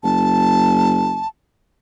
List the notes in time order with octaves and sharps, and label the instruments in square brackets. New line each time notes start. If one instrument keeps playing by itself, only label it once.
[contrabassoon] F#1 [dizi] A5